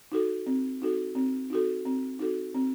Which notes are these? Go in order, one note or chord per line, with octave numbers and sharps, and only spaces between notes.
D#4 F#4 A4
C4
D#4 F#4 A4
C4
D#4 F#4 A4
C4
D#4 F#4 A4
C4